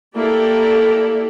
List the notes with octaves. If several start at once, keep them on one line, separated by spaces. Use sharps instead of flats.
A#3 E4 G4 A4 D5